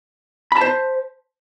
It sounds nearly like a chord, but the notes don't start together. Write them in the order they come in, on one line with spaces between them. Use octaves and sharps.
B5 A5 C5